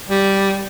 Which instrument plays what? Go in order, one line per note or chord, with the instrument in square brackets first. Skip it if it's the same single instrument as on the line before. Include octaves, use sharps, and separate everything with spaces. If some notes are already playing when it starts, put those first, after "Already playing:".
[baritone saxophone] G3